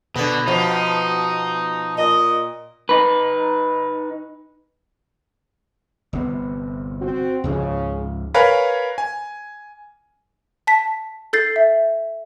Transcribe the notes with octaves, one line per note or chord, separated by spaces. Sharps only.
B2 D3 B3
B2 F3 D#4
A#2 D#5
D#4 B4
G1 C3 B3
C4 F#4
C#2 G#2 C#3 F3
A#4 B4 C#5 F5 G#5 B5
G#5
A5 B6
A4 G6 A6 C7
E5